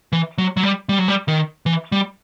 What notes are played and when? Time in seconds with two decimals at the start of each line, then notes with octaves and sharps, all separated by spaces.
0.12 E3
0.38 F#3
0.57 F#3
0.63 G3
0.89 G3
0.98 F#3
1.08 G3
1.28 D#3
1.66 E3
1.92 G3